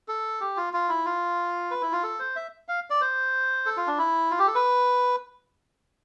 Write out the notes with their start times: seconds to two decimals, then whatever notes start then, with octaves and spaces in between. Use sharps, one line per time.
0.08 A4
0.41 G4
0.57 F4
0.73 F4
0.89 E4
1.06 F4
1.71 B4
1.82 E4
1.92 F4
2.03 A4
2.19 C5
2.36 E5
2.68 F5
2.90 D5
3.01 C5
3.66 A4
3.77 F4
3.87 D4
3.98 E4
4.31 F4
4.39 G4
4.47 A4
4.55 B4